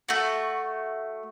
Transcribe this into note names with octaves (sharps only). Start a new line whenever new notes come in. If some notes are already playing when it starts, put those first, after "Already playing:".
A3 F#4